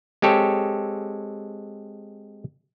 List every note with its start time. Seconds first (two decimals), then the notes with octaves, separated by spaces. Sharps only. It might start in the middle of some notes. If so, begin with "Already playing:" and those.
0.22 G#3 C4 G4 A4 C#5